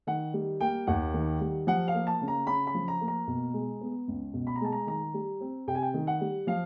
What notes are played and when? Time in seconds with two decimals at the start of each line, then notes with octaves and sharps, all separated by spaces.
0.07 D#3 F#5
0.33 G3
0.61 A#3 G5
0.87 D#2 F#5
1.14 D#3
1.41 G3
1.67 F3 F#5
1.88 F5
1.94 A#3
2.07 A5
2.21 C#3
2.28 A#5
2.47 C#3 B5
2.67 B5
2.74 F3
2.88 A#5
3.01 A#3
3.08 A#5
3.27 B2
3.53 G#3
3.81 B3
4.08 C#2
4.33 B2
4.47 B5
4.56 A#5
4.61 G#3 A5
4.72 A#5
4.87 D#3 A#5
5.14 G3
5.41 C4
5.67 C3 G5
5.75 G#5
5.82 G5
5.94 D#3
6.07 F#5
6.21 G3
6.47 F3 F5